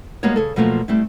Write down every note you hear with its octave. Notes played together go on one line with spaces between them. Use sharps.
G3 G#3 A#3 B3 F#4 C#5
C#3 G#4 A4
B2 F3 F#3 A3 A#3 F4
G3 A3 C4 E4